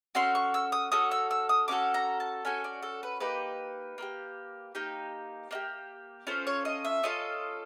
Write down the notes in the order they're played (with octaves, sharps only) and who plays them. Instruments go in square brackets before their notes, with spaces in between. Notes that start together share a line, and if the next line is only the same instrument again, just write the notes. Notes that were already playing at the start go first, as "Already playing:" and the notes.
[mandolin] C#4 F#4 A4 C6
C#6
E6
D#6
C#4 F#4 A4 D#6
E6
E6
D#6
C#4 F#4 A4 D6
A#5
A5
C#4 F#4 A4 G#5
D5
A4
B4
A#3 D#4 G4 B4
A#3 D#4 G4
A#3 D#4 G4
A#3 D#4 G4
C#4 F4 A4 C5
C#5
D#5
E5
C#4 F4 A4 D#5